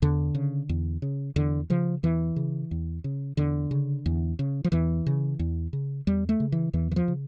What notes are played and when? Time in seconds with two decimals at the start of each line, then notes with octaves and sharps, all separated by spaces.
0.02 E2 D3
0.35 C#3
0.69 E2
1.02 C#3
1.36 E2 D3
1.70 C#3 F3
2.03 E2 E3
2.36 C#3
2.71 E2
3.04 C#3
3.37 E2 D3
3.71 C#3
4.06 E2
4.39 C#3
4.64 F3
4.72 E2 E3
5.06 C#3
5.39 E2
5.73 C#3
6.07 E2 G3
6.29 A3
6.40 C#3
6.52 E3
6.73 E2 E3
6.91 E3
6.96 F3
7.08 C#3